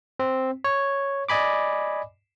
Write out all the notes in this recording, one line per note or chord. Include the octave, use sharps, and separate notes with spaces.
C4
C#5
D5 D#5 G#5 B5 D6